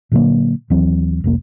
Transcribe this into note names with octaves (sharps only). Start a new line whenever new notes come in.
A#2 D3 F#3 A#3
D#2 E3 F#3 C4
F1 C2 A#3